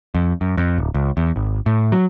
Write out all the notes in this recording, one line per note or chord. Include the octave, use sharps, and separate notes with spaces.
F2
F#2
F2
D1
C#2
E2
G#1
A2
F#3